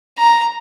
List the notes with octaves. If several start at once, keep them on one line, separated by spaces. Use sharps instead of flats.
A#5